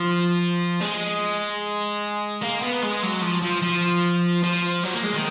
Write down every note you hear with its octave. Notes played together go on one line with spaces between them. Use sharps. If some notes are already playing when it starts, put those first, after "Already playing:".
Already playing: F3
G#3
A#3
B3
G#3
F#3
F3
F3
F3
F3
F#3
A#3
G#3
D#3